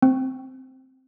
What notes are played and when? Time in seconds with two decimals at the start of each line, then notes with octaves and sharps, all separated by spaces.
0.02 C4